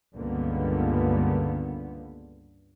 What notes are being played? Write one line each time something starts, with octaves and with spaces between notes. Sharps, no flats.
C#2 G2 D3 G3 A#3 B3